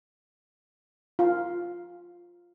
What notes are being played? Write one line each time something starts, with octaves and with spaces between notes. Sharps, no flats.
F4